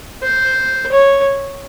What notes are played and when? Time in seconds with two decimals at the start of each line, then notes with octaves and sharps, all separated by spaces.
0.23 C5
0.92 C#5